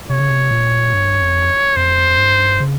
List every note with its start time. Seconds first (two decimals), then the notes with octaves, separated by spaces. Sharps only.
0.09 C3 C#5
0.19 C#3
0.29 C3
0.51 A#2
0.93 G2
1.21 F2
1.76 F2 C5
2.18 G2
2.60 C#3